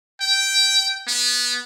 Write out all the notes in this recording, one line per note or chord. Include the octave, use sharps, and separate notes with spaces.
G5
B3